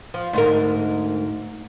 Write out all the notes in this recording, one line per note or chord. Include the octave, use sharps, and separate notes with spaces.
F3
D2 G#2 A#4